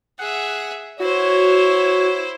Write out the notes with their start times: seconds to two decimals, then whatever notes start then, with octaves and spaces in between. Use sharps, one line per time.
0.19 G#4 E5 F#5
1.00 E4 F#4 C5 C#5